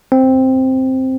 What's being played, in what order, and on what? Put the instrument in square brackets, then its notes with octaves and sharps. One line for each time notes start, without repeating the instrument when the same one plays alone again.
[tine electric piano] C4